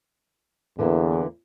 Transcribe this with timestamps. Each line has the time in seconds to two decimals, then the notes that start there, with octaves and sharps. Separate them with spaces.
0.79 E2 D3 E3 A#3